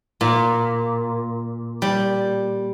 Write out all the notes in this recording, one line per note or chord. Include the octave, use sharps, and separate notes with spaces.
A#2
G3